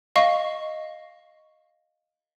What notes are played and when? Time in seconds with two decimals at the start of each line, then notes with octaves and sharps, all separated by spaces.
0.16 D#5 F5 C#6